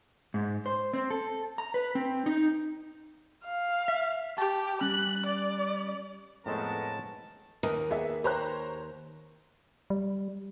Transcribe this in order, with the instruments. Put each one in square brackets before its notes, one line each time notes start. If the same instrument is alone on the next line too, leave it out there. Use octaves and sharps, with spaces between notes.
[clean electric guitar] G#2
C5
C4
A4
A#5
B4
C4
D#4
[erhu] F5
[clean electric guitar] E5
[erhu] G4 [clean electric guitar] A5
[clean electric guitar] G3 C#4 [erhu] F#6
[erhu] D5
[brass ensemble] F2 B3 A#4 [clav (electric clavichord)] A2 G#3 A3 [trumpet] A5
[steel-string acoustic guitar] D#2 [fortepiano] A#4 B4 D#5
[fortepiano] A#3 B3 [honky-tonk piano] G#4 E5
[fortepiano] G4 F#6 [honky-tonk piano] C5 C#5 A#5
[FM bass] G3